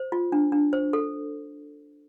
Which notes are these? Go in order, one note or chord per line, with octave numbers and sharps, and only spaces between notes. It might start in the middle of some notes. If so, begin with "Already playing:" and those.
Already playing: C5
F4
D4
D4
C5
A4